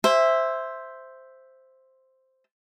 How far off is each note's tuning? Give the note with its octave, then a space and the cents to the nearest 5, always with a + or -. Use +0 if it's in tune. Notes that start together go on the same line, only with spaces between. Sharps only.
C5 +0 E5 +0 G#5 -35